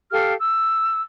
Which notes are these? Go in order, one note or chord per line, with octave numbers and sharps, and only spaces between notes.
G4 A4 F5 F6
E6